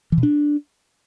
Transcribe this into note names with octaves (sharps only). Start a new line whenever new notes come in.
E3
B2
D4